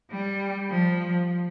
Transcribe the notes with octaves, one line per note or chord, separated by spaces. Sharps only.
G3
F3